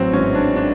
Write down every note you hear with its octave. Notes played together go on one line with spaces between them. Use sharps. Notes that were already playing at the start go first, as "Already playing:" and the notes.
Already playing: A1 F#3 C4
G#2 E3 C#4
D4
D4